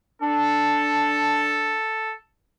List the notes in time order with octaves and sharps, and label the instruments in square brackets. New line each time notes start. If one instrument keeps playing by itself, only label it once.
[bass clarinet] D4 [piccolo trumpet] A4